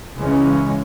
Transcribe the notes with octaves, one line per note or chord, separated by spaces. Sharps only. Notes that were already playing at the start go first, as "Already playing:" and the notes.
C#2 C#3 E3 G#3 C#4